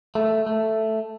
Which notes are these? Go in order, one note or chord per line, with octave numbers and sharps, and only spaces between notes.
A3
A3